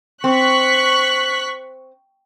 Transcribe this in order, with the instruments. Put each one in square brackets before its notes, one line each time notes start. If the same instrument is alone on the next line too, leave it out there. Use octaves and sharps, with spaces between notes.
[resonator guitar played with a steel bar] C4 [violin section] C#6 F#6 B6